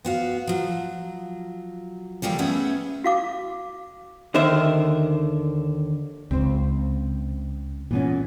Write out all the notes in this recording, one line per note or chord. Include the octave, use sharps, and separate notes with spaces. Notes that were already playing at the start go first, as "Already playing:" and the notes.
B3 F#4 F5
F3 F#3
E3 F3 G3 A#3 A4
A3 B3 C#4 E4 G#4 F#5
F#4 F5 D6
D#2 D3 D#3 C5 E5
C#2 C4 C5
A#2 E3 B3 C#4